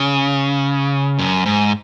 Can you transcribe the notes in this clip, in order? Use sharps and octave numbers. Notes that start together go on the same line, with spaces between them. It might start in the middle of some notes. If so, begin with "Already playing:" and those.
Already playing: C#3
F#2
G#2